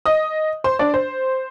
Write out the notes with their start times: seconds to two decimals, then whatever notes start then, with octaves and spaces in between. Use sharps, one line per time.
0.06 D#5 D#6
0.64 C5 C6
0.79 D4 D5
0.94 C5